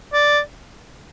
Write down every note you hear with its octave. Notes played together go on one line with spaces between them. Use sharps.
D5